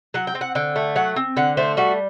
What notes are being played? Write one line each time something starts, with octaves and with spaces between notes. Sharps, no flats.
F#3 F#5
G5
C4
F#5
D3 G5
A3
F#3 F#5
C4
D3 F#5
A3 C5
G3 F#4